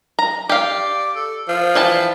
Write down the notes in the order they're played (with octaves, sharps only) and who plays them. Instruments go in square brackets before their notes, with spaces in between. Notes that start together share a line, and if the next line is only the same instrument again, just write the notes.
[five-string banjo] A#5
[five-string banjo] G4 F5 [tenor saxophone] D5
[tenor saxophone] A4
F3
[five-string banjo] E3 G5 A5